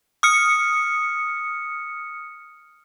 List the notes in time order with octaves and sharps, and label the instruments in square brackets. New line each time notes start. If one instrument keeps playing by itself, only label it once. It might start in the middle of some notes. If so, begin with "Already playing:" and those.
[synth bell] D#6 F6 C#7